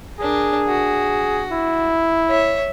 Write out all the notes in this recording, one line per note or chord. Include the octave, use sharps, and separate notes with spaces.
D4 G#4 A#4
F#4
E4
C#5 E5